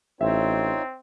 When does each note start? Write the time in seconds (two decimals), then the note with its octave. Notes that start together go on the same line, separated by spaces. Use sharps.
0.21 A1 C4 D#4 F4 C#5 E5